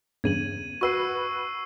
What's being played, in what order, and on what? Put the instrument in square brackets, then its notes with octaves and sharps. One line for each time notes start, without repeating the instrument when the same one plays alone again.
[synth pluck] E2 G2 C#3 [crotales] G#6 D#7 F#7
[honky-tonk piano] F#4 B4 [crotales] C#6 E6 C7